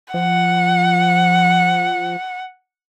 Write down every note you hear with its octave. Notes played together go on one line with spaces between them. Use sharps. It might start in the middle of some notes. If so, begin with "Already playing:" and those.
F3 F#5